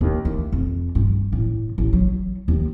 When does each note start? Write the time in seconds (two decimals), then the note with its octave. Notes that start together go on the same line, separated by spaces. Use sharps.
0.01 D#2
0.25 A3
0.52 F2
0.95 G2
1.32 A2
1.78 A1
1.93 F#3
2.48 D#2